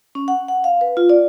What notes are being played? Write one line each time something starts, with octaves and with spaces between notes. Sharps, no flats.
C#4
F#5
F#5
F5
B4
F4
D5